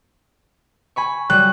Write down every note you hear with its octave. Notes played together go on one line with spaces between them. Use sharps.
G#5 B5 C#6
F#3 G3 F#6